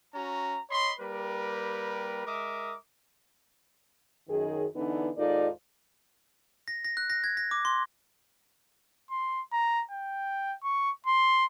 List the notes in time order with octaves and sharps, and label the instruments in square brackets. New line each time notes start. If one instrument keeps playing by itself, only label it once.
[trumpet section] C#4 F#4 A#5
C#5 D#5 B5 C6
G3 A#3 G4 A#4 B4
G#3 A#4 E5 D6 D#6
[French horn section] F#2 D#3 G#4
D3 E3 B3 D4 D#4
D#2 G#2 D#4 F4 A4 D5
[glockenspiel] A#6
A#6
F#6
A#6
G#6
A#6
D6
C6
[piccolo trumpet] C6
A#5
G5
C#6
C6